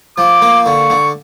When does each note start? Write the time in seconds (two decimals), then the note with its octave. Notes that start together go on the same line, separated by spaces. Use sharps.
0.18 F3 D6
0.42 A#3
0.66 D3 C#6
0.90 D3